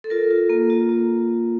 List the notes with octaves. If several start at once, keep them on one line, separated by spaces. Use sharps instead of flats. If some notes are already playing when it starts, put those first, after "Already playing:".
A4
F4 A#4
F4
A#3
F4
A#3